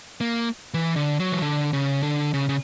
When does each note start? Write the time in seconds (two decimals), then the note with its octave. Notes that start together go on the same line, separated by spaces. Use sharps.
0.21 A#3
0.74 E3
0.96 D3
1.20 F#3
1.32 E3
1.42 D3
1.73 C#3
2.03 D3
2.34 C#3
2.49 C#3